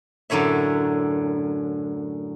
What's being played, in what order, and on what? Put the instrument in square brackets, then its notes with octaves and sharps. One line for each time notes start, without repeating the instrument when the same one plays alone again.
[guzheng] F#2 A2 D3 C#5 E5